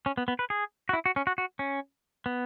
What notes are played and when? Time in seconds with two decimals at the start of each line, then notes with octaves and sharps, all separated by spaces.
0.06 C#4
0.18 B3
0.28 B3
0.39 B4
0.50 G#4
0.89 F#4
0.93 E4
1.06 F#4
1.16 C#4
1.27 F#4
1.38 F#4
1.59 C#4
2.26 B3